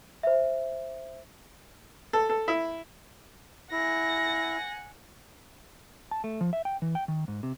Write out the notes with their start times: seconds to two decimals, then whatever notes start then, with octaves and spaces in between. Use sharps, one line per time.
0.23 C5 E5
2.13 A4
2.29 A4
2.48 E4
3.72 E4 F#5 G#5 A#6
6.11 A5
6.24 A3
6.41 F3
6.53 E5
6.65 G5
6.82 E3
6.95 G5
7.08 D#3
7.28 G#2
7.43 C3